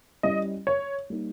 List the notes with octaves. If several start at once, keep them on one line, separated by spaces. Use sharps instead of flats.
G3 C#4 E4 D#5
C#5
G3 A#3 D#4